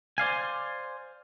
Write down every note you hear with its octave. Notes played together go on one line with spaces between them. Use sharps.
C5 D5 F5 G#5